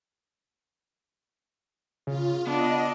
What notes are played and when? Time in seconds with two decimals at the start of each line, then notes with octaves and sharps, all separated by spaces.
2.07 C#3 F4
2.46 B3 D4 D#5